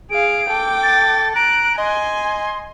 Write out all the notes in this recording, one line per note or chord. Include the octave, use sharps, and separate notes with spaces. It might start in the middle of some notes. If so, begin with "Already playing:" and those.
G#4 F5 D7
A4 G5 D6
A6
A#5 F#6 D7
D#5 G#5 C6